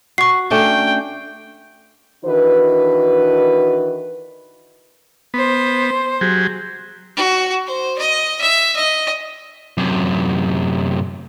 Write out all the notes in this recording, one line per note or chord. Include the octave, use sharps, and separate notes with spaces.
F#4 C#6 C7
A3 C#4 D4 G5
D#3 E3 D4 F#4 B4
B3 C5
F#3 G4 G#4
F#4
C5
D#5
E5
D#5
F#2 C3